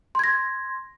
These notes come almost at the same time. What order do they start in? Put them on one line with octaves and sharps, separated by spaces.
C6 G#6 A#6